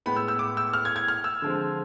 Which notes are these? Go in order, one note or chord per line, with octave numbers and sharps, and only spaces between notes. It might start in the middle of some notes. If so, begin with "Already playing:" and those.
A2 G#3 B3 B5
E6
E6
D6
E6
F6
G#6
G#6
F6
E6
D3 F3 G#3 C4